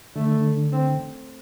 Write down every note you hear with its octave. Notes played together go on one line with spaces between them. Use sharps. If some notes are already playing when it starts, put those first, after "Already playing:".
D3 A3
C4